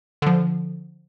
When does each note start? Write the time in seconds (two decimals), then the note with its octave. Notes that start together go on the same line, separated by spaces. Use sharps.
0.22 D3 F3